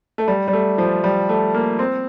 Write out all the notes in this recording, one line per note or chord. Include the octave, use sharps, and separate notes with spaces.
A3
G3
G3
A3
F3
G3
A3
A#3
C4